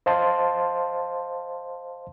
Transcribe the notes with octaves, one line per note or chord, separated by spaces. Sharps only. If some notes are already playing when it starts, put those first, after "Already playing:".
C5 D#5 F5 A5 C6